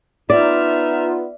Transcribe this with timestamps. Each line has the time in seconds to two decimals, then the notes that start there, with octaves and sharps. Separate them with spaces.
0.30 B3 D#4 F4 D5 E5 F6